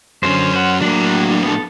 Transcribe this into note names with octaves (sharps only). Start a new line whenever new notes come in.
F#2 D3 C#4 C5
C5 F#5
A2 F#3 A#3 D4
B3 A4